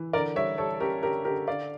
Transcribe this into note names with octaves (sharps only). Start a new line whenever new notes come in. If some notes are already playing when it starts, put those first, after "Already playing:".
Already playing: E3
D3 A#4 D5
G3 C#5 E5
G3 A4 C#5
A4
C#4 G4 A#4
D3 G4 A#4
D3 G4 A#4
D3 D5 F5